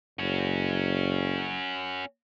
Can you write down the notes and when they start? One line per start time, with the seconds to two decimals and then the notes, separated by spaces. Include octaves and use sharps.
0.19 F#1 C#4 F#4